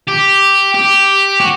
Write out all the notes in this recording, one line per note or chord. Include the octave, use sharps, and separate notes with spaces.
G4
G4
F#4